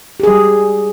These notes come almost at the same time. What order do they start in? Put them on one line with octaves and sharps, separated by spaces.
G4 G#4 G3